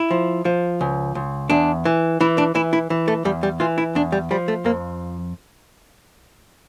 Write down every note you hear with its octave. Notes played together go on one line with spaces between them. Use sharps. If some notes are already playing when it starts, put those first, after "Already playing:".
Already playing: E4
F3
F3
C#2
C#2
E2 D4
E3
E3 E4
D4
E3 E4
E4
E3
A3
E2 G3
G3
E3 F4
E4
E2 D4
G3
F3 G3
A3
F2 A#3